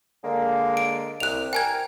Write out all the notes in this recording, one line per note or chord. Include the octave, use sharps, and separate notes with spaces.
D3 G#3 A#3
D7
C2 F#6 F7
A#4 G5 G#5 G#6